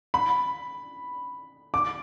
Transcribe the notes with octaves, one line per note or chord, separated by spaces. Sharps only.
B5
D6